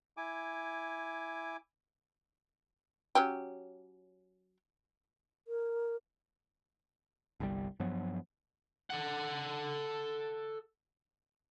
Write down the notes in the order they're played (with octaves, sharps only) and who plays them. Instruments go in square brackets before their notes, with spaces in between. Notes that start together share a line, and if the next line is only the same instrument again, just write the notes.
[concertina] E4 G#5 D6
[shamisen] F#3 C#4 G4
[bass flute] A#4
[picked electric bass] G1 C2 G3
G2 F3 F#3 B3
[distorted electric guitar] A4 F#5